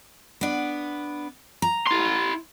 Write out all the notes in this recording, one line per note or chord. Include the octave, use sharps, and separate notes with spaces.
B3 D4
A#5
E4 C6